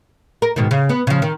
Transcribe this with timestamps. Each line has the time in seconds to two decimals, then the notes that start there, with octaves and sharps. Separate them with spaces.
0.42 A#4
0.56 G#2 B2 D#3
0.71 C#3
0.89 B3
1.07 C#3 F3
1.22 D#3